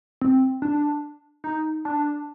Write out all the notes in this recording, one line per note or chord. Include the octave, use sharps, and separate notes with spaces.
C4
D4
D#4
D4